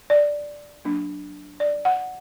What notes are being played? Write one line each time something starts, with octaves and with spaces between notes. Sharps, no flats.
D5
F#3 A#3 D4
D5
F#5